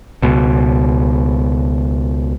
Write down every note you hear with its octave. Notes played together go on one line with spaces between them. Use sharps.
C#2 B2